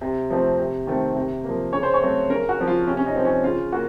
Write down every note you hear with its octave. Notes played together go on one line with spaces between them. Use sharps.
C3
F3 A3 C4
C3
D#3 A3 C4
C3
F3 A#3
C#3 C#5
C5
C#5
F#3 A3 C4
C#3 A#4
F#4
F3 C4
F4
C3 C#4
C#4
D#4
F3 C4
C#4
C#3 F4
A#3 F#4